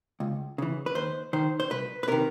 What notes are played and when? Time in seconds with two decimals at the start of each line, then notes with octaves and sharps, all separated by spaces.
0.20 C#2
0.58 C#3 E3
0.86 B4
0.95 D#2 C5
1.33 D#3 C5
1.60 C5
1.70 C2 B4
2.03 B4
2.08 C3 D#3 A#4